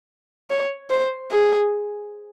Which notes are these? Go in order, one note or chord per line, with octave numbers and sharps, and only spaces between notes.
C#5
C5
G#4